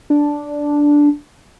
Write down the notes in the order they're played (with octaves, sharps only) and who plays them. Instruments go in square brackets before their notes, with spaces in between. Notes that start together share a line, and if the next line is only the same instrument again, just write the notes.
[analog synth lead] D4